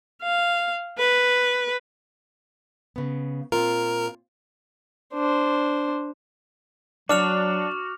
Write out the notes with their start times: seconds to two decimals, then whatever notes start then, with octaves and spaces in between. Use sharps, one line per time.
0.23 F5
0.99 B4
2.96 C#3 B3
3.52 A#2 C4 F4 A#4
5.14 D4 C5
7.09 F#3 D4 F#4 D6 F6 F7